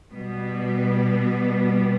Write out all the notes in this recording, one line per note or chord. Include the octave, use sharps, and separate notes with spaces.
B2 G3 B3